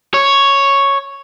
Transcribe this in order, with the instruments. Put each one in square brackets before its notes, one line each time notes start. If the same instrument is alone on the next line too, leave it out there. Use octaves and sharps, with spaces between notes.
[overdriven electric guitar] C#5